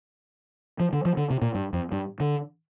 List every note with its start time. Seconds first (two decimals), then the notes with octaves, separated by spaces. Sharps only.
0.80 F3
0.93 D3
1.05 F3
1.17 D3
1.30 C3
1.42 A#2
1.55 G2
1.73 F2
1.92 G2
2.20 D3